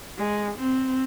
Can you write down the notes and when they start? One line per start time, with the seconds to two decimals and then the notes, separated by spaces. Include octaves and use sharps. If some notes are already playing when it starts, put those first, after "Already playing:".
0.17 G#3
0.58 C4